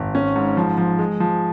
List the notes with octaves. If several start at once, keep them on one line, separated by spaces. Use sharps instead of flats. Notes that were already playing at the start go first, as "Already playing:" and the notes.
Already playing: G#1
C#4
G#2
F3
F3
G#3
F3